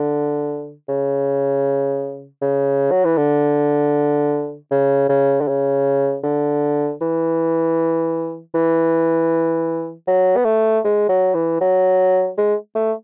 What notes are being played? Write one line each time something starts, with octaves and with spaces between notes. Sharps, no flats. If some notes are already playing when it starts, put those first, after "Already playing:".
Already playing: D3
C#3
C#3
F#3
E3
D3
C#3
C#3
D3
C#3
D3
E3
E3
F#3
B3
A3
G#3
F#3
E3
F#3
G#3
A3